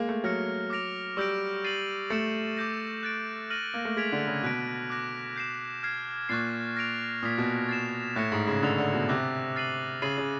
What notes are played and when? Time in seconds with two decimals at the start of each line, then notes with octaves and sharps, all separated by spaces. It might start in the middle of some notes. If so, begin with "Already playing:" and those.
Already playing: G#3 A#3
0.09 A3
0.24 F#3 F6 A#6 C#7
0.70 D6 F6 A#6 D7 F7
1.17 G3 C#6 E6 G6 A#6 D7
1.64 A6 C7 D#7 F#7
2.10 A3 A6 C#7 E7
2.57 D6 G6 A#6
3.03 F#6 A6 D7
3.50 F6 A#6 D#7 F#7
3.74 A#3
3.85 A3
3.96 G#3 G#6 B6 D7 F7
4.12 D3
4.28 C#3
4.43 B2 F#6 B6 D7
4.90 D6 F#6 A#6
5.36 G6 C7 E7
5.83 F6 G#6 C7
6.29 A#2 C#6 F#6 A6 C7
6.76 F6 A#6 D7 F7
7.23 A#2 D#6 G#6 B6
7.38 B2
7.69 A6 C7 E7
8.16 A2 F#6 A#6 C#7 E7
8.32 G#2
8.47 C#3
8.63 D3 E6 A6 C7 F7
8.78 D3
8.94 B2
9.09 C3 D6 F#6 A#6
9.55 F6 A6 C7 D#7 F#7
10.02 C#3 A6 C7 D#7 F#7
10.18 C#3